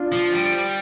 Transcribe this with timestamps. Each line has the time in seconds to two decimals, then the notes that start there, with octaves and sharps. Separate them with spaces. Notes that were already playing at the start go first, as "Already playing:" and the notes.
Already playing: D4 F4
0.12 F3
0.32 G3